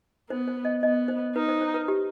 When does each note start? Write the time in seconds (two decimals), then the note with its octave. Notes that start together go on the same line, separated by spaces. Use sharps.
0.30 B3 C5
0.48 C5
0.65 D#5
0.83 B3 D#5
1.08 C5
1.35 D#4 B4
1.49 C5
1.61 C5
1.74 B4
1.88 G4